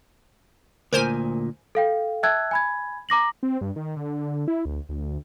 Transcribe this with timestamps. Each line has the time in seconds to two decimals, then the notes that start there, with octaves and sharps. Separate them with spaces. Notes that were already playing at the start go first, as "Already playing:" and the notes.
0.93 D2 A#2 A#4 C5 G#5
1.75 A4 F5 G5
2.23 E5 G5 A5 E6 F#6 G#6
2.51 G#5 B5 G#6
3.09 A#5 D6 A#6 F#7
3.43 C4
3.61 G2
3.76 D#3
3.97 D3
4.48 E4
4.65 D2
4.89 D2